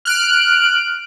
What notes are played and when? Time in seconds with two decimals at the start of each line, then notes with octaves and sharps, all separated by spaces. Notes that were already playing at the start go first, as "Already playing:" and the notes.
0.05 F6 F#6 D7